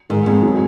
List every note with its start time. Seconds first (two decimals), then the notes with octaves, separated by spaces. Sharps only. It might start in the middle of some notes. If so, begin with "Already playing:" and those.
0.10 G#2 D#3
0.26 F2 G#2
0.43 F#3